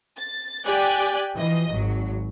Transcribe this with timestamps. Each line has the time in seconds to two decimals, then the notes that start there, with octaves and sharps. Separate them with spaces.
0.18 A6
0.65 G4 D5 G5 G#5 F#6
1.36 E3 F3 D#5
1.73 G#1 F#3